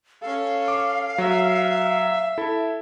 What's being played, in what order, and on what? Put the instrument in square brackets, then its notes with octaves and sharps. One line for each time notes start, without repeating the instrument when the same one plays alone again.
[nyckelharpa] C#4 A4 [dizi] F5
[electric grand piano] D6
[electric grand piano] F#3 [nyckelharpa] E5
[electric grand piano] E4 A4